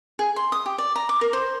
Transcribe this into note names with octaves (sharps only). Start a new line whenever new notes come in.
G#4
C6
D#6
G4
D5
A#5
D6
A#4
C5